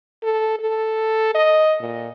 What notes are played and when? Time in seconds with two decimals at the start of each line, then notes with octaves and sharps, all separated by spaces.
0.23 A4
0.59 A4
1.35 D#5
1.81 A#2